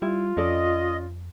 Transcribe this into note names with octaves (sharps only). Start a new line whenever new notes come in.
G3 E4 F4
F2 C#4 A4 D5 D#5